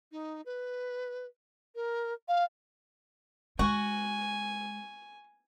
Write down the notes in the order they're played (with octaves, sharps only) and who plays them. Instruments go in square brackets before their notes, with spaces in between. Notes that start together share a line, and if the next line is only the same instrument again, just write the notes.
[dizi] D#4
B4
A#4
F5
[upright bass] G#3 [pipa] F#4 [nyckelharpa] G#5